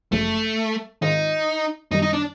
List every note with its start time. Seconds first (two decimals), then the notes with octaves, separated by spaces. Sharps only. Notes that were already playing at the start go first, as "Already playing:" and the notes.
0.12 G1 F#2 C#3 F3 G#3 A3
1.02 G#2 D#3 G#3 C4 D#4 F4
1.91 F#2 D#3 G3 D#4
2.02 D#4
2.13 D4